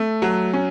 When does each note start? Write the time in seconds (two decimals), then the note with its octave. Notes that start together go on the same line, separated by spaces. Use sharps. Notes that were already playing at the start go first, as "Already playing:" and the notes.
Already playing: A3
0.22 F#3
0.54 C#4